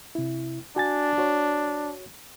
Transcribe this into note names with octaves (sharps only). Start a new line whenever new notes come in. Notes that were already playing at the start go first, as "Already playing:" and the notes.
C3 E4
D4 F#4 G#5 A6
F#4 C#5